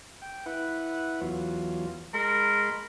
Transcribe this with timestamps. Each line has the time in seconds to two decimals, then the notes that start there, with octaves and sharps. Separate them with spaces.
0.22 G5
0.46 E4 B4 F#5
1.21 E2 F#3 F4
2.14 G#3 A#4 B5 C6